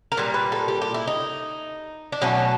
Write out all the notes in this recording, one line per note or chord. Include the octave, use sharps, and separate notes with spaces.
A#4
A#2 G3 B4
B4
A4
G4
G4
E4
D#4
D4
B2 F#3 A3 C#4